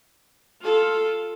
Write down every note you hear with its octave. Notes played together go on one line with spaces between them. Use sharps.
F4 A4